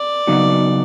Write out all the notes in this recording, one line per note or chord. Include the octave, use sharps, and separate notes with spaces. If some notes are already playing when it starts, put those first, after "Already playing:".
Already playing: D5
C#3 F#3 B3 D#4 F#4